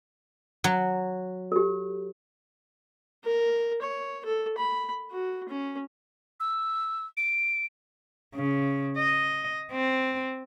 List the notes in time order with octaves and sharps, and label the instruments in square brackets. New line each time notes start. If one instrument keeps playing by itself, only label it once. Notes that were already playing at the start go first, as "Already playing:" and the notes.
[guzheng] F#3
[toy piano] G4 A4
[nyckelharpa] A#4
C#5
A4
B5
F#4
C#4
[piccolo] E6
D7
[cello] C#3
D#5
C4